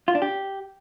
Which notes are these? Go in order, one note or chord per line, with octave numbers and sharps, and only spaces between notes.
F4
D4
G4